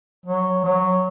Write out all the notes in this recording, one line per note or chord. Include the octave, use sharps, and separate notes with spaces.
F#3
F#3